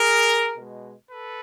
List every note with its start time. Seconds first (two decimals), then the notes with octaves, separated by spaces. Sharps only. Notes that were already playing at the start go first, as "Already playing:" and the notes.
Already playing: G#4 A#4
0.55 B2 G#3
1.11 A4 B4